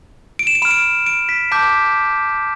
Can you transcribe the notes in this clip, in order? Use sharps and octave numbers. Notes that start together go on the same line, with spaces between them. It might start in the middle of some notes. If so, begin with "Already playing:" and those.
D7
E7
D7
B5 F6 E7
D7
D7
B6
A5 D6 G6 B6